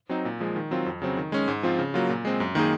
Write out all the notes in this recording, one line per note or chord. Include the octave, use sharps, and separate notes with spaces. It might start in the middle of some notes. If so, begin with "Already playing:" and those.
F#3 C4 D#4
A#2
F3 G#3
D#3
F#3 C4 F4
F2
C#3 F#3 C4
D#3
G#3 C#4
G#2
F3 C4 F4
C#3
F#3 A#3 F4
A#2
G#3 C4
F#2
D#3 A#3 D#4 G#4